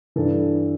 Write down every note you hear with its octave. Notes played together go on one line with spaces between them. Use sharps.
G2 E3 A4